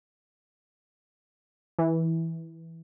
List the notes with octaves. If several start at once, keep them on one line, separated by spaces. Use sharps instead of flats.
E3